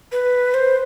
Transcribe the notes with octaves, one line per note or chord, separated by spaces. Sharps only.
B4
C5